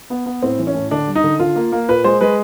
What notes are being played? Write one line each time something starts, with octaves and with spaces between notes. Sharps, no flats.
B3
B3
A2 C4
E3
C#4
A2
D3 D4
G3
D#4
D3
D3 F4
A#3
A#3
A#2 B4
G#3 C5
G#3 B4